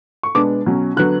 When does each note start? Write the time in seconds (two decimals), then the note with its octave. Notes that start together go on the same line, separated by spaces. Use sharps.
0.23 C#6
0.35 B2 G#3 B3 D4 D6
0.66 B2 F#3 C#4
0.97 D3 F#3 B3 F#6